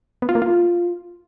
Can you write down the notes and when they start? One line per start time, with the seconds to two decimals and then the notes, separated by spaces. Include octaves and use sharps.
0.22 B3
0.29 F4
0.35 A#3
0.42 F4